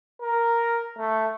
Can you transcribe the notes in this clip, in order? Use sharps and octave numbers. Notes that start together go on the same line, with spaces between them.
A#4
A3